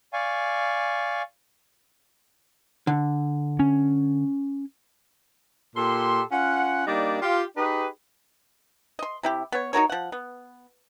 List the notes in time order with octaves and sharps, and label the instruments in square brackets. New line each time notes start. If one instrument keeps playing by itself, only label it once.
[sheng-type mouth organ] D5 F5 G#5 C#6
[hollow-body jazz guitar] D3
[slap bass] C#4
[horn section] A#2 G4 A4 C6
C#4 F4 F#5
G3 A#3 D4 D#4 D5
F4 G4
D#4 G4 G#4 B4
[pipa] D#5 C6
C3 E4 G4
B3 C#5
D#4 F#4 A#4 C#5
F3 F#5
B3